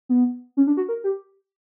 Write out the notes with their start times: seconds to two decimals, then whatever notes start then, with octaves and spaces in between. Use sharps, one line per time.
0.09 B3
0.57 C#4
0.67 D4
0.77 F#4
0.89 A#4
1.04 G4